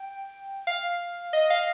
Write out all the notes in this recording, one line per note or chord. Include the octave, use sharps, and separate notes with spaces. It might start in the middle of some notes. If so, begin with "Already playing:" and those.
Already playing: G5
F5
D#5
F5